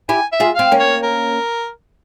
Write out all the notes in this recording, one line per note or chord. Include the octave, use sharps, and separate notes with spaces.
E4 G4 G#5
E5
F4 G#4
C4 F5
A#3 C#4
C#5
A#4